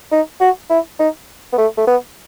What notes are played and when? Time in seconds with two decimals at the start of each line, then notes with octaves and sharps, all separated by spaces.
0.12 D#4
0.41 F#4
0.70 E4
0.99 D#4
1.52 B3
1.58 A3
1.77 A3
1.87 B3